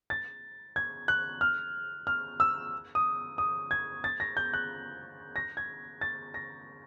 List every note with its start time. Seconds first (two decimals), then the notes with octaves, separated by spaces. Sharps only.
0.10 A6
0.76 G#6
1.08 F#6
1.41 F6
2.07 F6
2.40 E6
2.95 D#6
3.38 D#6
3.71 G#6
4.04 A6
4.20 A#6
4.37 G6
4.53 F#6
5.36 A#6
5.57 G#6
6.01 A6
6.34 A#6